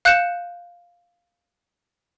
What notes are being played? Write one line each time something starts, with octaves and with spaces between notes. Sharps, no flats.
F5 F#6 G6 C#7 E7